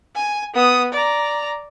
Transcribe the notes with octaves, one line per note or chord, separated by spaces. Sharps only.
G#5
B3 D#6
D5 A#5